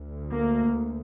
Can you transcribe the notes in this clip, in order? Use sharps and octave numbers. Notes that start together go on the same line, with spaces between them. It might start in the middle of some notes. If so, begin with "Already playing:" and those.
Already playing: D2
A#3